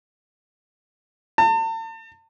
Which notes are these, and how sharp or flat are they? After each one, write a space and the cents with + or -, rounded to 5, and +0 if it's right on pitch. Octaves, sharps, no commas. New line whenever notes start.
A5 +40